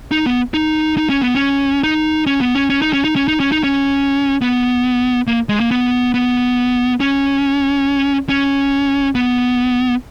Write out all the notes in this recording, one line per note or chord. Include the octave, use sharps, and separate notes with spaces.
D#4
B3
D#4
D#4
C#4
B3
C#4
D#4
C#4
B3
C#4
C#4
D#4
C#4
D#4
C#4
D#4
C#4
D#4
C#4
B3
A#3
G#3
A#3
B3
B3
C#4
C#4
B3